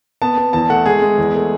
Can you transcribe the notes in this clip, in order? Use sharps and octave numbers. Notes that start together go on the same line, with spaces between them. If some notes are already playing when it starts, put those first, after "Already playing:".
B3 A5
B3
E2 A5
A3 F#5
G#3 G#4
G#3
E2
A3